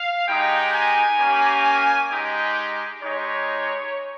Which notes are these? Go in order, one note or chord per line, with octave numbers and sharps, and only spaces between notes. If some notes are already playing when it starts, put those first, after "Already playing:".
Already playing: F5
G#3 D#4 G4 G5
G#5
A#3 C#4 G4
G#3 D#4 G4 G5
G#3 D#4 G4 C#5